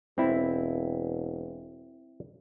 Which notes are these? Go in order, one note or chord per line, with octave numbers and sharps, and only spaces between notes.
E1 C4 E4